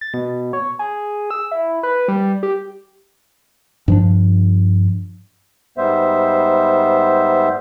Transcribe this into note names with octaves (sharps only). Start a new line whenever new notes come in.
A6
B2
C#5
G#4
E6
E4
B4
G3
G4
G2 F3 D4
G#2 G3 B3 C5 E5